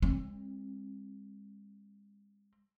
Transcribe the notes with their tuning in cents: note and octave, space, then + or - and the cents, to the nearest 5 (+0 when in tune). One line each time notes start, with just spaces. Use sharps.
G#3 -40 C4 +35